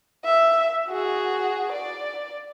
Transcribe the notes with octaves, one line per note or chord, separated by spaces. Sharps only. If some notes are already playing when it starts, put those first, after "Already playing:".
E5
F#4 G#4
D5